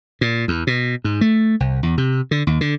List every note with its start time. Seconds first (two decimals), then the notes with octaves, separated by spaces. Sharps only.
0.21 A#2
0.48 E2
0.67 B2
1.04 G#2
1.21 A3
1.60 C2
1.83 E2
1.98 C3
2.31 D3
2.47 D#2
2.61 D3